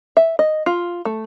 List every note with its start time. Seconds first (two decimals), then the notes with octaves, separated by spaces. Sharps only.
0.17 E5
0.39 D#5
0.66 F4
1.05 A3